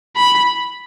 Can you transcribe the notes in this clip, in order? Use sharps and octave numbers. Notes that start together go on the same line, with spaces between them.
B5